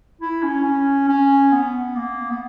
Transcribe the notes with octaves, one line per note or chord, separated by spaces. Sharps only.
E4
C#4
C#4
C#4
B3
A#3
B3